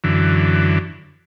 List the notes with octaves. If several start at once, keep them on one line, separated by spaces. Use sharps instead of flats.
F#2 D3 E3